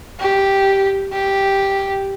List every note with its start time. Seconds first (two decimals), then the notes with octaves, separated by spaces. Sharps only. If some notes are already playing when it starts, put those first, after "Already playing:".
0.20 G4
1.12 G4